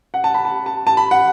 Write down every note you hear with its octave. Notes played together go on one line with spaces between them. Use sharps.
F#5
A5
B5
A5
A5
A5
B5
F#5